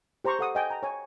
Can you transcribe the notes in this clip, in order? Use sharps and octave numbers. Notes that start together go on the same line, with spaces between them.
G4 C5 A#5 C6 C#6
A4 F#5 D#6
D#5 G5 G#5
A#5
C#5 G#5